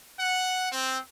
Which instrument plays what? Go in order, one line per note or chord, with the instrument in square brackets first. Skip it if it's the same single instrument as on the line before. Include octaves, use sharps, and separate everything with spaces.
[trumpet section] F#5
C4